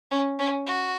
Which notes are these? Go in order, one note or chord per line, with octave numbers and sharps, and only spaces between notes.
C#4
C#4
F#4